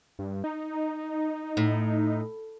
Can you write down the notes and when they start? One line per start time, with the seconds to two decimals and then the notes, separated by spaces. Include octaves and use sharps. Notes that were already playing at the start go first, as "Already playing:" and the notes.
0.19 G2
0.44 D#4
1.57 A2